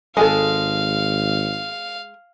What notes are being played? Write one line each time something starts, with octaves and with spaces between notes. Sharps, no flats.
G#1 G#3 G#4 A4 F5